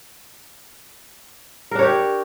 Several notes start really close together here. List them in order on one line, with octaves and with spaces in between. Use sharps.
A#4 D4 C#5 G4